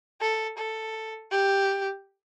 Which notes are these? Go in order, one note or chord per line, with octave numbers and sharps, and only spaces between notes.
A4
A4
G4